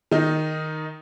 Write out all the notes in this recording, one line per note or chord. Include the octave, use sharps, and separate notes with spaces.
D#3 D#4